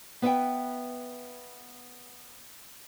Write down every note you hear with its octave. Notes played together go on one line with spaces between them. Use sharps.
B3 B4 E5 F#5 G5